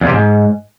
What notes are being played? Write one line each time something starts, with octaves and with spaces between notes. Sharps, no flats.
E2
C3
G#2